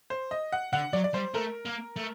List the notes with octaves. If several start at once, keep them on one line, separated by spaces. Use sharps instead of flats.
C5
D#5
F#5
D3 F#5
F#3 D5
D5
G3 C5
A3 A#4
A#3
A3